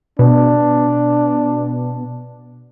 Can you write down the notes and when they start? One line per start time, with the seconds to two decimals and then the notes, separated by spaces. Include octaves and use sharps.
0.19 B2 D4